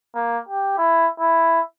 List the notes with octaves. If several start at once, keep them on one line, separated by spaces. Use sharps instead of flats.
A#3
G4
E4
E4